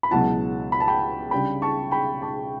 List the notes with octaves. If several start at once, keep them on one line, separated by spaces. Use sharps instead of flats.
B5
C#2 B2 F#3 B3 E4 F#5 A5
B5
A5
G5 B5
C#3 G3 D4 G5 B5
A5 C#6
G5 B5
A5 C#6